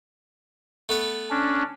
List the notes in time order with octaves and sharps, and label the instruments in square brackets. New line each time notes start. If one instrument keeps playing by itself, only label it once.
[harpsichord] A3 B3 B4
[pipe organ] C#4 D4